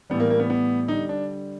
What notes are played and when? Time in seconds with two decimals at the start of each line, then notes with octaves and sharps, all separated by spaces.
0.10 A2 E3 G3 B3
0.20 A#3
0.30 A#3
0.40 B3
0.50 B3
0.88 D3 G3 D#4
1.09 D4